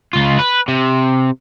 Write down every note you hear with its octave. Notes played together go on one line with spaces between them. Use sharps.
C#2 F4
B4
C3